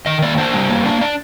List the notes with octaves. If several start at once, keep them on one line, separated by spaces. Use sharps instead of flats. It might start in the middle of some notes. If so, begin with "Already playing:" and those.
D#3 D#5
A#3 D5
D4 C5
G3
A#3
D4
D4 D5